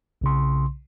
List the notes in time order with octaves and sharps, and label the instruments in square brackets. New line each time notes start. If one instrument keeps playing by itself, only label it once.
[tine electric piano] B1 C#3 C6